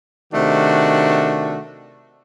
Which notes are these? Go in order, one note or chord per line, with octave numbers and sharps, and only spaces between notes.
C3 D#3 A3 D4 F#4